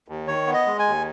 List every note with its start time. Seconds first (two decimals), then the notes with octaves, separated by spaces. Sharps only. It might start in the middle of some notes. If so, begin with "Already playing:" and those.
0.08 D#2
0.27 D#3 C#5
0.47 B3
0.54 D#5
0.66 G#3
0.79 G#5
0.86 D#2